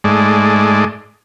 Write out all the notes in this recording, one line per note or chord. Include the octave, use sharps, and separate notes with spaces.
G#2 G#3 A3 D5